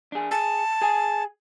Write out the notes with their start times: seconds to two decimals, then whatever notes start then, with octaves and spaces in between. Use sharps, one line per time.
0.12 D4 G#4
0.31 G#4 A5
0.82 G#4 G#5